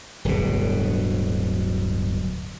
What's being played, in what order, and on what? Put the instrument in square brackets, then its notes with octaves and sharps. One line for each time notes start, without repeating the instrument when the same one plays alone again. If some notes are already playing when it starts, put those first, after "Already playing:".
[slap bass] D1 G1 B2